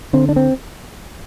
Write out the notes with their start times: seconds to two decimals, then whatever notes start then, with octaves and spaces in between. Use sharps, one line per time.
0.13 D3 C4
0.29 D4
0.36 C4